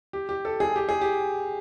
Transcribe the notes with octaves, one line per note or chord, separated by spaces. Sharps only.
G4
G4
A4
G#4
G4
G#4
G4